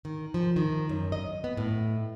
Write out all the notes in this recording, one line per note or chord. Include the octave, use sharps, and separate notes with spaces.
D#3
F3
D#3
F#2
D#5
B3
A2